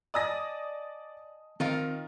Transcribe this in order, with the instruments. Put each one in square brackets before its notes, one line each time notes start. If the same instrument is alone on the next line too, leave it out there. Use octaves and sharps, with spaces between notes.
[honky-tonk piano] D5 D#6 A#6 [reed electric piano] D#5 G#5 A5
[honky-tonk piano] D#3 [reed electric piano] C4 [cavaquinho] D#4 F4 A#4